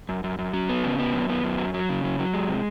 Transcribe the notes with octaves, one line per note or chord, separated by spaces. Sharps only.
F#2
F#2
F#2
F#3
B3
C#3
B3
F#2
B3
F#2
F#3
F#3
C#3
F#3
F#3
G#3
C3